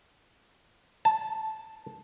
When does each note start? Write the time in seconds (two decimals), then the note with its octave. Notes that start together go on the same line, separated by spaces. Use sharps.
1.05 A5